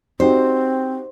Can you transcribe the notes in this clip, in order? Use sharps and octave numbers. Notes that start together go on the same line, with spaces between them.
C4 D#4 F#4 G4 C5